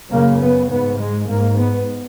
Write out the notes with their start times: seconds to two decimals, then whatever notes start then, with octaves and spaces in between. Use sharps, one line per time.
0.11 F#2 C#3 A#3
0.42 B3
0.70 G#2 B3
0.99 G#3
1.29 G#2 A#3
1.58 B3